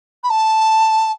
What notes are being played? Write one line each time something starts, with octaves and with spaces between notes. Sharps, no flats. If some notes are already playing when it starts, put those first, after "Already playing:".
B5
A5